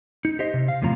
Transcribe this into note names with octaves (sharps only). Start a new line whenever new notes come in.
D#4
G4 C5 D#5
C3
F5
E2 A2 C3 F3 A#5